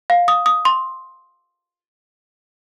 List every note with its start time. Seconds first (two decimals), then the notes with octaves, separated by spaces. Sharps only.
0.10 F5
0.28 D#6
0.46 D#6
0.65 C6